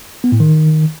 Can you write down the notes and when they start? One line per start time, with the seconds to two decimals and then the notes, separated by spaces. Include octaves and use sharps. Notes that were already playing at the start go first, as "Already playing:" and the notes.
0.24 B3
0.32 A2
0.40 D#3